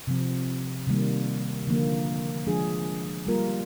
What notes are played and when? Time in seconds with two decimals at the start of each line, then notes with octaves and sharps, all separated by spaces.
0.07 C3 F3 C4
0.87 C3 D#3 G3 A#3
1.67 D3 F3 A#3
2.47 F3 G#3 D4 G#4
3.27 G3 A#3 F4 A#4